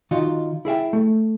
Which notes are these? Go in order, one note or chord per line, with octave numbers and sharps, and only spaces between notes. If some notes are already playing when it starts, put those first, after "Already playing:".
D#3 D#4 F4 F#4
E4 G#4 E5 G5
A3